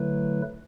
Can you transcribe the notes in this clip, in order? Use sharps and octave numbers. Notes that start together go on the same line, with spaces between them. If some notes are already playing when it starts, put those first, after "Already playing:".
Already playing: D3 F#3 A3 E4 B4